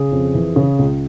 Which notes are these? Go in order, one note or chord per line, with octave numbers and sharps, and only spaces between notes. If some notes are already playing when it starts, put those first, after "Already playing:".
Already playing: C#3 G#4
F2
E3
C#3
C#2